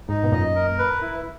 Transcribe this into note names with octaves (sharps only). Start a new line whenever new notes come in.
G#2 D#4
B2
F#2 A#2 D#5
A#4
B4
E4